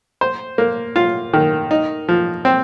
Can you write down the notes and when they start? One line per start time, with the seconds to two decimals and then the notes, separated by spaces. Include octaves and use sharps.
0.21 C5
0.58 A#3
0.96 F4
1.33 D#3
1.71 D#4
2.09 F3
2.45 C4